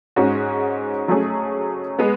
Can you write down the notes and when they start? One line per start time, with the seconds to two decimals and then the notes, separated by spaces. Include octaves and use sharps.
0.16 G#2 G#3 C#4 F#4
1.08 F#3 A3 C#4 G#4
1.99 G#3 B3